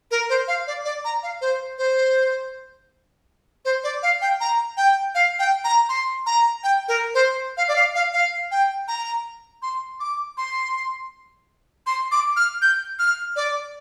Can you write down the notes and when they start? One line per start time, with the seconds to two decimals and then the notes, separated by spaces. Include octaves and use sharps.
0.11 A#4
0.30 C5
0.48 F5
0.67 D5
0.85 D5
1.05 A#5
1.23 F5
1.41 C5
1.78 C5
3.65 C5
3.84 D5
4.03 F5
4.22 G5
4.40 A#5
4.77 G5
5.15 F5
5.39 G5
5.64 A#5
5.89 C6
6.26 A#5
6.64 G5
6.88 A#4
7.14 C5
7.57 F5
7.68 D5
7.76 F5
7.95 F5
8.13 F5
8.51 G5
8.88 A#5
9.62 C6
10.00 D6
10.37 C6
11.87 C6
12.12 D6
12.36 F6
12.62 G6
12.99 F6
13.36 D5